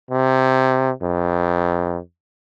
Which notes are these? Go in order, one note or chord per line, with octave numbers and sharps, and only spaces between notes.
C3
F2